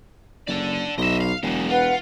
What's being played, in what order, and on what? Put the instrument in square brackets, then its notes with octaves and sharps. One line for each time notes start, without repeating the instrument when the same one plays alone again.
[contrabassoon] F#1 [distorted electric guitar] A4 D5
[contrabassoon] B1 [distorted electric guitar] D#5 E5
[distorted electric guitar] F5
[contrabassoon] E1 [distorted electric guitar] F#3 G#3
[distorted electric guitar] F4 [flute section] B4 F#5